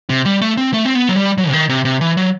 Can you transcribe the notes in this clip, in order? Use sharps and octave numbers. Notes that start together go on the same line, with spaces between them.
C3
G3
A3
C4
A3
C4
B3
F#3
G3
F#3
C3
D#3
C3
C3
E3
F#3